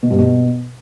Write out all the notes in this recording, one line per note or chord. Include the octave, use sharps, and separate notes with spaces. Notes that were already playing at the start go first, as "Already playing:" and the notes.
B2
G2
B2